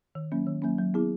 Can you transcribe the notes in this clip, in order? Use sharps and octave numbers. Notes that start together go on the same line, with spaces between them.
D#3
F#3 A#3 C#4
D#3
F#3 A#3 C#4
F#3
B3 E4 G#4